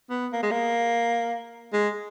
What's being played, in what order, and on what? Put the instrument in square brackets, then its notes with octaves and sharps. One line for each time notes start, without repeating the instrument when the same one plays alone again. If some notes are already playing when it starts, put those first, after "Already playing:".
[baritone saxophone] B3
A#3
G#3
A#3
G#3